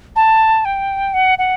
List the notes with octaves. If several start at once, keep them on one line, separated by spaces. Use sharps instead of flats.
A5
G5
F#5
F#5